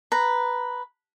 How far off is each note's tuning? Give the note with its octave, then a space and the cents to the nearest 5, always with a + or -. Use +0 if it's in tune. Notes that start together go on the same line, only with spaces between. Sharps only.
B4 +0 A#5 +0